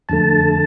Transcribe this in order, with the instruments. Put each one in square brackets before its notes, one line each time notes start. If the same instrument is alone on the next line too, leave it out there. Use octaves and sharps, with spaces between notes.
[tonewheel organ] F2 D3 A3 A5